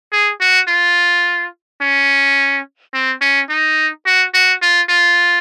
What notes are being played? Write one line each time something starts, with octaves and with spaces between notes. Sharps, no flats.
G#4
F#4
F4
C#4
C4
C#4
D#4
F#4
F#4
F4
F4